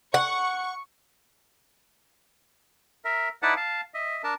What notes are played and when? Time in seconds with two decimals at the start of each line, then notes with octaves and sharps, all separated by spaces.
0.14 F#5 C#6
3.05 A#4 E5
3.42 D#4 E4 B4 D5 F#5 A5
3.57 F5 A5
3.94 D#5 E5
4.24 D4 A#4 A5